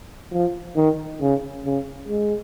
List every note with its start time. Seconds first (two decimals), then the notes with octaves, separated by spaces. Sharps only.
0.32 F3
0.76 D#3
1.21 C#3
1.65 C#3
2.08 G#3